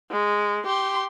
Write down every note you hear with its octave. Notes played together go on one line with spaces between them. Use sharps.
G#3
G4 C6